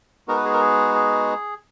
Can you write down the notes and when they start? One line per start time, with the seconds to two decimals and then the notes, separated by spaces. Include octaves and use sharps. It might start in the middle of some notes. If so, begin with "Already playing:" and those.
0.28 G#3 B3 D#4 F#4 A#4
0.37 B4
0.45 G#4
0.53 A#4
0.61 G#4
0.95 G#4